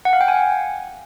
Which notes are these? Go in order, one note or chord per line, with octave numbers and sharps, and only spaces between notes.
F#5
F5
G5
G#5